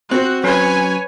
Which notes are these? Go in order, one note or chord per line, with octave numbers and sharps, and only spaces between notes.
C4 F#4 C5 F#6
F#3 C#4 B4 C#5 G#5